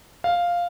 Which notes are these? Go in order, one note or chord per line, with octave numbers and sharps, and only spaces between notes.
F5